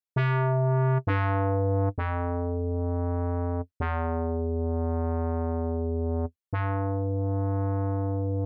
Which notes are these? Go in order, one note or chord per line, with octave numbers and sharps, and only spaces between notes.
C3
G2
F2
E2
G2